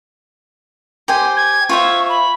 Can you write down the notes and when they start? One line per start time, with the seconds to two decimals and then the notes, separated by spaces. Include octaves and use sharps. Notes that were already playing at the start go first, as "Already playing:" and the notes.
1.08 G4 C5 G#5
1.36 G#6
1.69 F4 C5 E5 C#6
2.09 B5